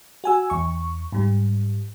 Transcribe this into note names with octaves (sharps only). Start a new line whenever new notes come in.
F#4 G#5 E6
E2 C#6
G#2 G3